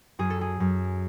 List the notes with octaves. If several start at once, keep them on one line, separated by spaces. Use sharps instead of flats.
F#2 G#4
A4
G#4
F#2